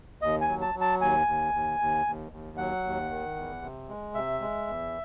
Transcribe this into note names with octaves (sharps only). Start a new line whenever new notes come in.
D#2 D#5
G#5
F#3
A5
F#3
A5
D#2 G#5
D#2
D#2
D#2
D#2
D#2
F#3 F#5
D#2
D#3
E2
C3
G#3
C3 E5
G#3
E2